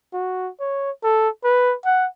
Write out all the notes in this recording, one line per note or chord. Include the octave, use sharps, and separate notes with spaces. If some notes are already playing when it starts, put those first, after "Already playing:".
F#4
C#5
A4
B4
F#5